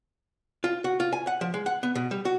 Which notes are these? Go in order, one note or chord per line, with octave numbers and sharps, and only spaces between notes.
F4
F#4
F4
G#5
F#5
F3
G#3
F#5
B3
B2
G3
F#4